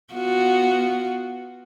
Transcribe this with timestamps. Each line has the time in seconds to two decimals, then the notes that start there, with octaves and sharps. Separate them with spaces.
0.14 B3 F4 F#4